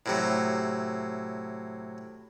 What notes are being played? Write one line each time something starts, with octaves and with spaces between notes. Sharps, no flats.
A2 C3 F#3